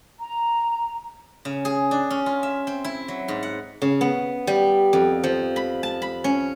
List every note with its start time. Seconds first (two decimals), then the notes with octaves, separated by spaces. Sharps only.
0.19 A#5
1.45 C#3
1.65 G#4
1.91 D4
2.10 C#4
2.26 F4
2.43 E5
2.67 C4
2.84 E4
3.08 F#3
3.28 G#2
3.43 F#5
3.82 C#3
4.01 B3
4.47 G3
4.93 F2
5.24 F3
5.56 B5
5.83 A5
6.02 B5
6.24 C#4